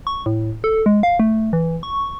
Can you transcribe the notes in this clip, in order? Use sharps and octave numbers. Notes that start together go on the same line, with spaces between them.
C#6
A2
A4
G#3
F5
A3
E3
C#6